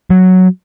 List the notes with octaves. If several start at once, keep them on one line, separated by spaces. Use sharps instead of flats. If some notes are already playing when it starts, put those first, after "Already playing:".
F#3